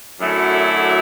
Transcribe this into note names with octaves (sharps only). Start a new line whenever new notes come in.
F#2 D3 F#3 A3 E4